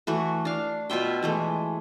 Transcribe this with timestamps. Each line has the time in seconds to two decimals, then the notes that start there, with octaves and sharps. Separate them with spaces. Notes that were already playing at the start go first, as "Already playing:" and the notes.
0.07 E3 A3 F#4
0.45 D4 F5
0.90 B2 F4 E5 G5
1.23 E3 G#3 A3